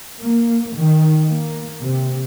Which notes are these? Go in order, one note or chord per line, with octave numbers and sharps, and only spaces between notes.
A#3
D#3
A#3
C3